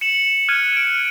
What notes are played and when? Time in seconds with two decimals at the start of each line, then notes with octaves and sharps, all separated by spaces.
0.01 C#7 E7 F#7
0.49 F6 F#6 G#6 D#7
0.77 D7